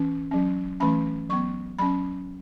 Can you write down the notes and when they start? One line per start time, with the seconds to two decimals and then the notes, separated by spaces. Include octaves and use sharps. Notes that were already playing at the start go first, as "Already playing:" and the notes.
Already playing: E3 C#4
0.31 F#3 C#4
0.80 E3 A3 C#4 B5
1.29 F#3 B3 C#6
1.79 F#3 C#4 B5